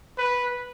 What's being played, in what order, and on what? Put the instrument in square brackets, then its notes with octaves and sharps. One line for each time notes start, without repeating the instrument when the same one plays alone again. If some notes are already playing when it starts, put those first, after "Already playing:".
[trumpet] B4